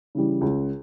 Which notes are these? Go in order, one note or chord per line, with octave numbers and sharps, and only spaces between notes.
C#3 E3 G3
C#2